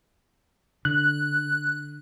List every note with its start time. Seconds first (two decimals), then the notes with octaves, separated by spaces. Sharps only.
0.85 D3 F#6